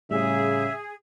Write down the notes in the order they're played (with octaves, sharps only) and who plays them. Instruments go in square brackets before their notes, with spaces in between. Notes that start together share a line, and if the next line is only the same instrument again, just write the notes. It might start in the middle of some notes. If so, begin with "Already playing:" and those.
[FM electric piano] A2 G3 [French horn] C#3 [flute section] G#4 [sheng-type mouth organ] E5